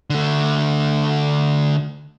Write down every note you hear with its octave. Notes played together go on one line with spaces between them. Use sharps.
D3 A3